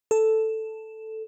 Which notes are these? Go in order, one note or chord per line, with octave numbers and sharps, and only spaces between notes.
A4